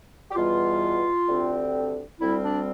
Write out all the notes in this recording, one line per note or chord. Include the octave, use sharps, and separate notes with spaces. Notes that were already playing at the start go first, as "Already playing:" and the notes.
G4
E2 B2 G3 F4
D2 D3 G3 C4
D2 D3 G3 C4 E4
D4